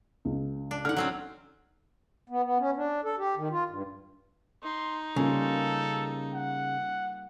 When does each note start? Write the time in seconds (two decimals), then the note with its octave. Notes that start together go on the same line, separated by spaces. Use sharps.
0.25 C#2
0.71 D4
0.85 D3 D#4 F#5 F6
0.97 F#3 C4 C#4
2.30 B3
2.43 B3
2.59 C#4
2.76 D4
3.04 A4
3.18 G4
3.37 D#3
3.51 F4
3.69 G2
4.63 D#4 C6
5.16 C#3 G3 A#3 F4 A4
6.33 F#5